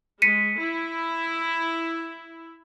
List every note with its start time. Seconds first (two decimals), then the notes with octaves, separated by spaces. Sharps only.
0.22 G#3 B6 C#7 D#7
0.59 E4